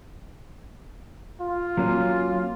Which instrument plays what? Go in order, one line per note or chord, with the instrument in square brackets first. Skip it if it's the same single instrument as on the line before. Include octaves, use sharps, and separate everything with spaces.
[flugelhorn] F4
[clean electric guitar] F#3 A#3 C#4